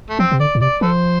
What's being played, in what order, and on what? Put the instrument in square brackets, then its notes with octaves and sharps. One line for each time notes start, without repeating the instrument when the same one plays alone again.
[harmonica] A3
[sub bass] F3 [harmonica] C4
[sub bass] C3
[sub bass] D3 [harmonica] D5
[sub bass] A2
[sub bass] C3 [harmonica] D5
[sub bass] F3 [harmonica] A4 C5